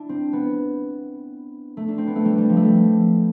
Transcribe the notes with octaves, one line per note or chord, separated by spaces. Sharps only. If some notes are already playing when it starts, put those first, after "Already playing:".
Already playing: D4 E4
C4
B3
A3
D4
C4
B3
A3
G3
G3
F3
A3
G3